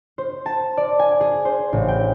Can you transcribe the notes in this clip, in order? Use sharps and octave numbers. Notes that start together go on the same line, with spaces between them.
C5
A5
D5
G#5
G#4
C5
A1
G5